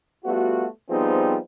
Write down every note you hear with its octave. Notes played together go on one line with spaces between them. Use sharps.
G3 A3 B3 F4 F#4
F3 G3 B3 C4 D#4 G#4